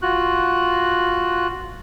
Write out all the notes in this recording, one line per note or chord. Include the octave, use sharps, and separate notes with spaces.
F4 F#4 F#6